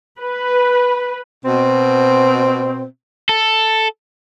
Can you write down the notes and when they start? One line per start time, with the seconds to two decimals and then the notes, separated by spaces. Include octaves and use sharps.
0.19 B4
1.44 B2 C4
3.29 A4